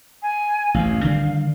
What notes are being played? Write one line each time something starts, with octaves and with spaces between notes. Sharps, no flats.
G#5
A1 F#2 F5
D3 D#3 G3